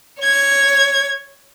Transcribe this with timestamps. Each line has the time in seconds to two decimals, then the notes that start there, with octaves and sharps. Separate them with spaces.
0.20 C#5 G#6